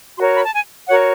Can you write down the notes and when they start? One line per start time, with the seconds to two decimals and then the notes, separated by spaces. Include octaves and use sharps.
0.17 F#4 A#4 C#5 C6
0.35 B5
0.45 A5
0.53 G#5
0.89 F#4 A#4 C#5 F#5